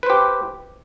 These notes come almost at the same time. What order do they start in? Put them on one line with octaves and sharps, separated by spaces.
B4 C5 G4